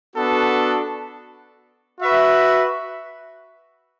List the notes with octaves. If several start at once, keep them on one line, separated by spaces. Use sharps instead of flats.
B3 D4 F#4 A4
F#4 B4 E5